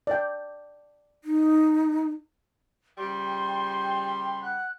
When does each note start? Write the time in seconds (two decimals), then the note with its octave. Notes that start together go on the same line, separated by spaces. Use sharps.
0.07 D5 G5
1.24 D#4
2.98 C#3 F3 G3 G5 C6
4.42 F#5 F#6